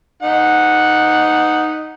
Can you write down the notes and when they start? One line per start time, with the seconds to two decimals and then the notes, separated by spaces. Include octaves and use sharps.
0.23 D#4 F#5